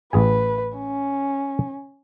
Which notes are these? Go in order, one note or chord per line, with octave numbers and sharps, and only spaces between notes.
A1 G#4 B4 G#5
C#4